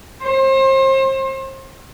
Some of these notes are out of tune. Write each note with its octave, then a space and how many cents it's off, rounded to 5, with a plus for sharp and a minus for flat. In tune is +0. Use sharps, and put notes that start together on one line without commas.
C5 +35